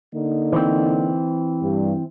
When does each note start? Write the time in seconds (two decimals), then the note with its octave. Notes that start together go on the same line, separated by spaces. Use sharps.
0.14 D3 A#3 D#4
0.52 E3 C4
1.63 G2